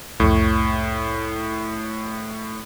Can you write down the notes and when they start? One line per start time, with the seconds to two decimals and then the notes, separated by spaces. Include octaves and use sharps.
0.20 C2 F2 A2 C#6